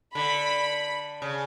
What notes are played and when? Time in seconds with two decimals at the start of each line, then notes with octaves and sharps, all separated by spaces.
0.14 D3 B5
1.22 C#3